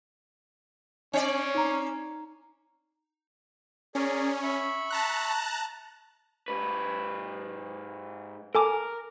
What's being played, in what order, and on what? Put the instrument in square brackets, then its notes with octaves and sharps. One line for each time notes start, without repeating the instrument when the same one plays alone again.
[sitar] C4 D5 [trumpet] C#4
[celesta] D#4 A#5
[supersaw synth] C#4 [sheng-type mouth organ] G#4 A#4 D5
[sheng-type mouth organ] E5 B5 C#6
[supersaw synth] A5 A#5 F#6
[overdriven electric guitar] G#2 B4
[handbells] A4 G#5 D6 [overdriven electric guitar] A#4